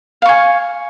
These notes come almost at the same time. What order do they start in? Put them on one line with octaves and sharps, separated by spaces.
F5 C#6 G#5